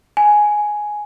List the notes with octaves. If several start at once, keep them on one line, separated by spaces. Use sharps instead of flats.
G#5